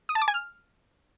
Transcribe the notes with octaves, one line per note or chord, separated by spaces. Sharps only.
D#6
A5
D6
G#5
F6